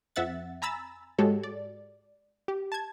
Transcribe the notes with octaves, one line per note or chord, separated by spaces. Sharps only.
F2 C4 E5 F#5 A6
G#5 A#5 B5 E6 A6
G#2 G#3 F#4 G4 A4 C#5
D5
G4
A5 G#6